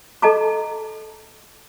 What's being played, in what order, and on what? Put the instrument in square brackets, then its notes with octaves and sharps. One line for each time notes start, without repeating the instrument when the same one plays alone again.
[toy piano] A4 D#5 A5 A#5 D6